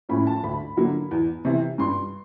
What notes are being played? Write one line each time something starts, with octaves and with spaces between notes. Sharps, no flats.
A2 F3 A#3 C#4 B5
A5
D2 B5
D3 F#3 A#3
E2
C3 E3
G2 C6